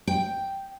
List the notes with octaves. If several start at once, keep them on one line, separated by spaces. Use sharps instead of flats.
G5